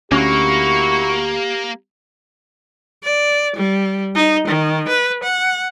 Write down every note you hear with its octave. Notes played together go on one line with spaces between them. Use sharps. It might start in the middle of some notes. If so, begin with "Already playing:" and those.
D2 A#3 C#4 E4 F#4 G4 C#6
D5
G3
D#4
D#3
B4
F#5